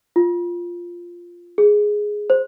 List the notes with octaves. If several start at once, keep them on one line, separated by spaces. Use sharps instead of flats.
F4
G#4
C5